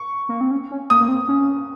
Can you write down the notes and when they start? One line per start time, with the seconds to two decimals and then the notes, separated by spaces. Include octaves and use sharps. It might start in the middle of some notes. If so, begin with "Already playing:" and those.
Already playing: C#6
0.29 A#3
0.41 C4
0.51 C#4
0.71 C#4
0.90 A#3 D#6
1.00 A#3
1.08 C4
1.28 C#4